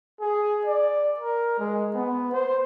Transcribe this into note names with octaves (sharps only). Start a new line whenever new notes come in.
G#4
D5
A#4
G#3
B3
C5